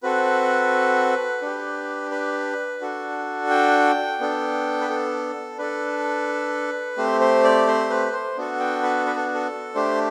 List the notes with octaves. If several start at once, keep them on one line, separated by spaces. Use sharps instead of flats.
C4 F#4 A4 B4
D4 G4
B4
D4 F#4 A4
G5
B3 D4 A4
B4
A4
D4 A4 B4
A3 C4 G4 C5
C5
D5
C5
B4
C5
B3 D4 F#4 A4
G5
B4
B4
A4
A4
A3 D4 G4 C5